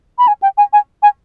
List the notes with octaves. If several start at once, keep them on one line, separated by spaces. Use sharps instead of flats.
B5
G#5
G5
G#5
G#5
G#5